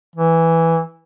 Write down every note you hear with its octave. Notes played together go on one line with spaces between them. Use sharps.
E3